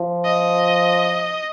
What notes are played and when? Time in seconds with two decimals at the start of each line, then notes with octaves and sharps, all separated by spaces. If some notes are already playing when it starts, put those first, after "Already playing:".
Already playing: F3
0.25 D#5